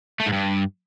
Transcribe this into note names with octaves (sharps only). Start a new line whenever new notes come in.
A3
G#2
G2